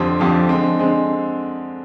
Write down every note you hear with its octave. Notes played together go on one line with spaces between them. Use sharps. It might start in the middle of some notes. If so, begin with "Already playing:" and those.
Already playing: F2 D3 F3 C4 G4
F2 D3 F3 C4 G4
D3 G#3 C4
D3 G#3 C4